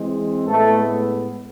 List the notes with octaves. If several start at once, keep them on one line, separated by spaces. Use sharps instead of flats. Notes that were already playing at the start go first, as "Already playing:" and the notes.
Already playing: E3 G#3 C4
A2 G#3 A3 B3 A4